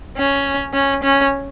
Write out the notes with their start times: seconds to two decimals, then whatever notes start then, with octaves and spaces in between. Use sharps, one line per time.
0.18 C#4
0.74 C#4
1.03 C#4